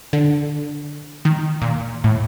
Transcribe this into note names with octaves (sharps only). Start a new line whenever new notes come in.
D3
D#3
A#2
A2